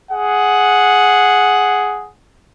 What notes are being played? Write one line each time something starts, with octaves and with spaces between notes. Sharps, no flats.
G#4 F#5